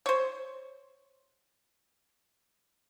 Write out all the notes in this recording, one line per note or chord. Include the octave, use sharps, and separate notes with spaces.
C5 C#5